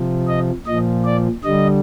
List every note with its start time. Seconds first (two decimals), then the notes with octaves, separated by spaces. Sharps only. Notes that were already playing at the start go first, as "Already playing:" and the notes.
Already playing: C3 F3
0.28 D#5
0.67 A#2 F3 D#5
1.05 D5
1.44 D3 G3 D#5